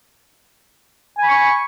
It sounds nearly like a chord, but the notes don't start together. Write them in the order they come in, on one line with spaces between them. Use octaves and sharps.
G#5 B5 C#6